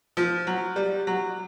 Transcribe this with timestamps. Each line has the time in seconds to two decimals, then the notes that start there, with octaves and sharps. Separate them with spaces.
0.17 F3
0.47 F#3
0.76 G3
1.07 F#3